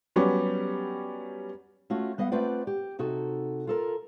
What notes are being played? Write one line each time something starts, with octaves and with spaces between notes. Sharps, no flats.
F#3 G3 B3 C#4 G4
A3 C#4 F4 F#4
G3 B3 D#5 F5 F#5
A3 C4 F4 B4 D5 F#5
G4
C3 D#4 F#4 A4
F4 A4 A#4